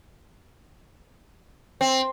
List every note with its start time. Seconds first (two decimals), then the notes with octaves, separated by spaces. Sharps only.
1.81 C4